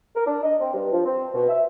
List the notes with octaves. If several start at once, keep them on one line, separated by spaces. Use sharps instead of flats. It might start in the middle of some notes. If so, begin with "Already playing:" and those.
A#4
D4
D#5
C4
G2
F3
C4
B2
E5